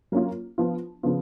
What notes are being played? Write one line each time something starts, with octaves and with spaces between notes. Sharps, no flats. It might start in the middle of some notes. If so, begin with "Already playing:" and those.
F#3 A#3 C#4 F4
F3 B3 F4
C#3 F3 B3 F4